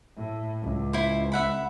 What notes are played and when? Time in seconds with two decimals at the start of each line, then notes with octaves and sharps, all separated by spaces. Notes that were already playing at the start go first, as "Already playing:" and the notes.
0.17 A2
0.63 C#2
0.93 E4 C5
1.32 E5 F#5 B5